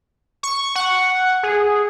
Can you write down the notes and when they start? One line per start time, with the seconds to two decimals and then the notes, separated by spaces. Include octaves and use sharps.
0.43 C#6
0.76 F#5
1.43 G#4